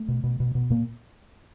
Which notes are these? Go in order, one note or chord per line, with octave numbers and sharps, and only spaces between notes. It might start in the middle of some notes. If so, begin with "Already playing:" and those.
Already playing: A3
B2
B2
B2
B2
A#2 A#3